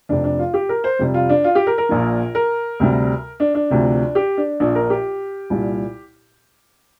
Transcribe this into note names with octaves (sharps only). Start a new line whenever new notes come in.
F1 F2 C3 D4
D4
F4
G4
A#4
C5
F2 C3 G3
F4
D4
F4
G4
A#4
A#4
A#1 A#2 F3
A#4
D2 C3 G3
D4
D4
D2 C3 F3
G4
D4
A#1 A#2 F3 D4
A#4
G4
C2 A#2 G3